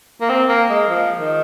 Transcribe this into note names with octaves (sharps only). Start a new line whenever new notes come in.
A#3
C4
A#3
G#3
F3
D#3